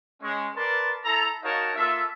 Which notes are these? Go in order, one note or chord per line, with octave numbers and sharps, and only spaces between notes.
G#3 C#4
A#4 B4 D5 A5 C6
E4 A4 A#5
D#4 F#4 A#4 C#5 F5 A5
A#3 F4 A4 E5